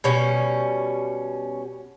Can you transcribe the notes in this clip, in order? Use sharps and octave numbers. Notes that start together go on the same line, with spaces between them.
B2 G3 C#4